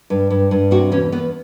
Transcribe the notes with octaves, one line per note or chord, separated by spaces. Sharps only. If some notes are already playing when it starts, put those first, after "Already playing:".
G2
G2
G2
C3 F#4
E2 C#4
E2 B3